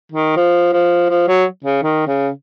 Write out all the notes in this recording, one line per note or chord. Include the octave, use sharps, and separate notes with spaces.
D#3
F3
F3
F3
F#3
C#3
D#3
C#3